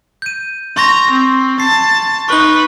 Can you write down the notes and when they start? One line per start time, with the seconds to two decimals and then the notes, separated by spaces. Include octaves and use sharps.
0.22 G6 D#7
0.77 A#5 C6 C#6 A#6
1.11 C4
1.60 A5 C7
2.29 D#4 B4 C#6 G7